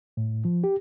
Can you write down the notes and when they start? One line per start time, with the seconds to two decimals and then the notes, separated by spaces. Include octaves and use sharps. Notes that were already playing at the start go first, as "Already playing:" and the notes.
0.17 A2
0.45 F3
0.64 G4